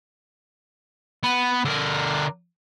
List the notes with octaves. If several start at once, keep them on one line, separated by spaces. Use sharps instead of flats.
B3
D3 A#4